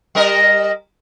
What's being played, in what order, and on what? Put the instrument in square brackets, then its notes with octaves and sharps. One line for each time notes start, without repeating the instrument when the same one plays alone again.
[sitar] G3 A#4 D#5